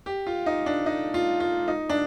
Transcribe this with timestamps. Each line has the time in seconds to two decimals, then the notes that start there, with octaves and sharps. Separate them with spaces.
0.06 G4
0.27 F4
0.46 D#4
0.66 D4
0.86 D#4
1.14 F4
1.40 F4
1.68 D#4
1.89 D4